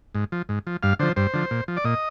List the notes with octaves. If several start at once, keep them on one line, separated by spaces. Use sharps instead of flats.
G#2
F3
G#2
F3
G2 F5
D3 F3 C5
G2 C5
D3 F3
A#2
F3
D5
A#2 D#5